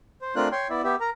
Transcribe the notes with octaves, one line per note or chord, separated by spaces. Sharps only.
C5
A3 C4 D4 F4 A#4 F#6
C#5 G5 C6
B3 E4 D5 E5
B3 G4 E5
A#4 A#5